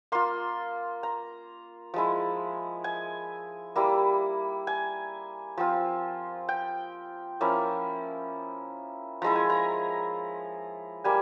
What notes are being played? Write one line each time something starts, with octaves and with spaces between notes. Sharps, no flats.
A#3 F4 C6
A#5
F3 G#3 E4
G#5
G3 A#3 E4
G#5
F3 C4 F4
G5
F3 A#3 C#4 E4
F3 G#3 E4 A#5
G#5
A#5
G3 A#3 G#5